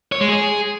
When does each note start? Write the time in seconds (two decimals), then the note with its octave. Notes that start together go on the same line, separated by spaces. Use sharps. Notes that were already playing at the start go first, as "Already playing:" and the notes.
0.12 C#5
0.21 G#3
0.29 G#4